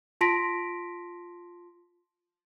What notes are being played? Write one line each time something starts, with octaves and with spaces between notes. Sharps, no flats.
F4 A5 C6 A#6 B6 D7